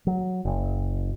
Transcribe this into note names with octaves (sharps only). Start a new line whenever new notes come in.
F#3
F#1